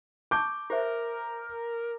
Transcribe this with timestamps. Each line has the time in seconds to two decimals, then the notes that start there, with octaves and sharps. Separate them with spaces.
0.31 A5 C#6 D6 G6
0.70 G4 A#4 C5 E5